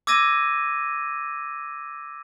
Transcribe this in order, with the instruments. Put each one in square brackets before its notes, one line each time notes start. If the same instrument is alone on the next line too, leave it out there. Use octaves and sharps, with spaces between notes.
[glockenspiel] D6 E6 G#6 A#6 D#7